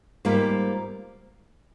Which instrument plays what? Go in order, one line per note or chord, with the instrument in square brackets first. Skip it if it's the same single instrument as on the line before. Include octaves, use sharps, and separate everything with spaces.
[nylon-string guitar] G#2 G3 A#3 F4 C5